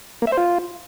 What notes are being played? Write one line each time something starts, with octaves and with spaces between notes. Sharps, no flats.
A#3
E5
C5
F4